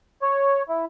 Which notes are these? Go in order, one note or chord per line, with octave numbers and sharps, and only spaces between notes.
C#5
E4